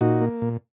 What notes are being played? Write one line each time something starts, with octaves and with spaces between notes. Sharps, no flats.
A#2 D#4 F#4
A#3
A#2